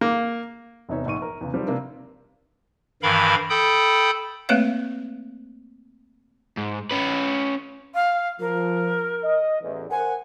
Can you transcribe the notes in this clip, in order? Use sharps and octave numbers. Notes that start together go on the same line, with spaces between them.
A#3
E1 C3 B3 D#4 C#5 E5
A#1 G#2 C#6 D#7
A#4
E2 C#3
D#3 F3 G3 C4
C3 A#3 D4
G2 D#3 E3 A#4 F5 B5
A4 G5 B5 D#6 G6
A3 A#3 C4 B4 C#5 F5
G#2
C#4 B4
F5
F3 A#4
D#5
A1 E2
A#4 C5 F#5 G#5